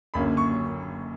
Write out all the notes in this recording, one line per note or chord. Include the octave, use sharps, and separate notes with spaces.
F#1 F#2 D3 A#3 C#4 B5
C#6